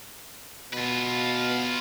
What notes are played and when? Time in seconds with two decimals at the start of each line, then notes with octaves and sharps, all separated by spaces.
0.73 B2 F4 B4